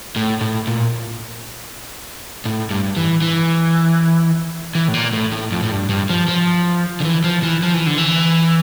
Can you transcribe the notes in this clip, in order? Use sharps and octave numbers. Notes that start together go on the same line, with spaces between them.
A2
A2
A#2
A2
G2
E3
E3
E3
A2
A#2
A2
A2
F2
A2
G2
G2
F3
F3
D3
E3
F3
E3
F3
E3
D3
E3